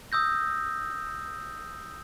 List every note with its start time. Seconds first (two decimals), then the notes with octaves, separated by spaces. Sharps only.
0.12 D#6 E6 G6 A#6